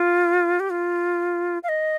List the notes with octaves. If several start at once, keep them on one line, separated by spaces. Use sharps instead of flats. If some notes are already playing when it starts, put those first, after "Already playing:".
Already playing: F4
G4
F4
F5
D#5